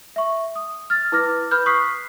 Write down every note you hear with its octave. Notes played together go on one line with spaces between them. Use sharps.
E5 C#6
D#6
F6 A6
E4 B4 D6 F6 A#6
B4 B5 F6 G6
C#6 D#6 F#6 B6 C7